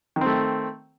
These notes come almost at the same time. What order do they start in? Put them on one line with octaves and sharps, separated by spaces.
D#3 C4 A3